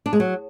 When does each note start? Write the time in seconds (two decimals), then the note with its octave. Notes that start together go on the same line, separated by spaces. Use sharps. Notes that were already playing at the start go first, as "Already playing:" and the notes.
0.06 D4
0.13 G#3
0.20 F#3